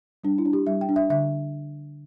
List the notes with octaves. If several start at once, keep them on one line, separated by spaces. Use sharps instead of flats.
G3 D4
E4
D4
G4
G3 E5
G5
D4
E5
D3 E5